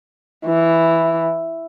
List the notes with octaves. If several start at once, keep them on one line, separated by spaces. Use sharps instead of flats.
E3